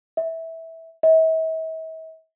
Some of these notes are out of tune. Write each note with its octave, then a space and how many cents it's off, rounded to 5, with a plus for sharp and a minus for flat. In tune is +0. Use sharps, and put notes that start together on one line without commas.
E5 -15
E5 -45